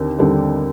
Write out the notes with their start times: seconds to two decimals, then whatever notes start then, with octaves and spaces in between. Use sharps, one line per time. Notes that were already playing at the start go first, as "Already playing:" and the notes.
Already playing: D#2 D3 C4
0.19 D#2 D3 G3 C4